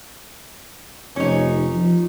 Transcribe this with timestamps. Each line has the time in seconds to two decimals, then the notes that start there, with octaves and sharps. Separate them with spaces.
1.16 F1 C#4 D#4
1.74 F3